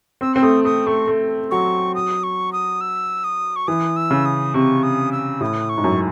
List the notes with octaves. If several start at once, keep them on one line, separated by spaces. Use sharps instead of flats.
C4 E6
C4 E6
A3 D#6
A3 D#6
A3 C#6
A3
F#3 C#6
D#6
C#6
D#6
E6
D#6
C#6
E3 D#6
E6
C#3
D#6
C3 C#6
D#6
E6
A2 D#6
C#6
G#2
F#2